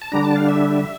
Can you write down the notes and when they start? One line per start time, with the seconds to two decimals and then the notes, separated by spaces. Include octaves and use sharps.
0.02 A5
0.12 D3 G3 D4 A#5
0.24 A5
0.36 F5
0.49 E5